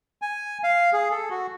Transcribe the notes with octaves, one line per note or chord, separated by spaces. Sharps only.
G#5
F5
G#4
A4
F#4